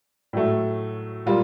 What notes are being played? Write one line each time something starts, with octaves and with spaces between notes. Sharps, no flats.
A2 F#3 A3
A#2 G3 A#3 F4